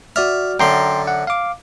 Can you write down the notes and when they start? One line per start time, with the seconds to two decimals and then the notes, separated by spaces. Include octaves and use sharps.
0.16 F#4 D5 E5 F6
0.60 F#2 D3 G5 A#5 C6
1.07 F#5
1.27 F5 D6